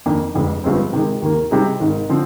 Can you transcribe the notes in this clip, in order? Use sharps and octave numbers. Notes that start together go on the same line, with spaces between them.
F2 D#3 A#3 D4
F1 F2 D3 G#3
G1 G2 F3 G#3 C4
C3 D#3 G#3
D#2 D#3 A#3
C3 G3 C4 D#4 G#4
G#1 G#2 D#3
D3 F3 C4